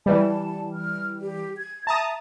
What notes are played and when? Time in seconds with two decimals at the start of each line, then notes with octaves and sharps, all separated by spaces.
0.06 E3 G3 A5
0.73 F6
1.21 G4
1.57 G#6
1.87 E5 A5 A#5 D#6